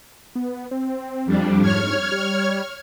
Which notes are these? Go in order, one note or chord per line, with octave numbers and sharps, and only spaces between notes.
B3
C4
F2 G3 D4
G#2 C#5 F6 G#6
G3